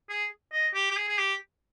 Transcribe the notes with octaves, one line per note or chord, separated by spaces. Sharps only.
G#4
D#5
G4
G4
G#4
G#4
G4